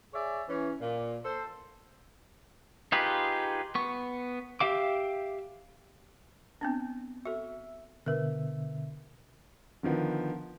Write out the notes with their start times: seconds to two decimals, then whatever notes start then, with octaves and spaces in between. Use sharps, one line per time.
0.14 G#4 C#5 D5 E5
0.49 E3 C#4
0.81 A#2
1.25 A4 C5
2.92 D#4 F4 G4 G#4 B4
3.75 B3 C#6
4.60 G4 E5 F5 D6
6.61 B3 C4 D4
7.25 F#4 A4 E5
8.06 B2 D3 A#4 B4 E5
9.83 D3 D#3 F3 B3